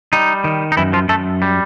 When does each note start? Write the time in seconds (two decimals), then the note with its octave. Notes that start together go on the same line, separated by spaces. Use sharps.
0.13 G3 D#4
0.44 D#3
0.72 D#4
0.77 F#2 E3 E4
0.93 F3 F4
1.09 F#2 A3 A4
1.42 G3